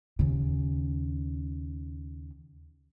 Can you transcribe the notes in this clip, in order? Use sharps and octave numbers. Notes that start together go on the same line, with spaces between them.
D#2 C#3